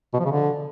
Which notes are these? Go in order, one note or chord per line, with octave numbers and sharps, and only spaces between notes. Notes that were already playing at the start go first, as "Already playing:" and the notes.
B2
F3
C#3
D3